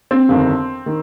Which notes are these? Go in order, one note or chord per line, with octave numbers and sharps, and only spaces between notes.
C4
G1 F2 D#3
D#3